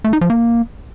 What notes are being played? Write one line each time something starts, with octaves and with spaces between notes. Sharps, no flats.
A3
D#4
F3
A#3